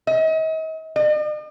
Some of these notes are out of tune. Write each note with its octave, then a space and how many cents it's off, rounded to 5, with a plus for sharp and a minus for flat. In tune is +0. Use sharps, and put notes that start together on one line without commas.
D#5 +40
D#5 -45